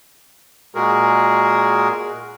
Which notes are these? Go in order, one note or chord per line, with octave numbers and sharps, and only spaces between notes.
A#2 G#3 F#4 G#4 A#4